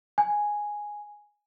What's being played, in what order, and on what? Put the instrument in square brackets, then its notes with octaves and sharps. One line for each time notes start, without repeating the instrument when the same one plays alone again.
[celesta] G#5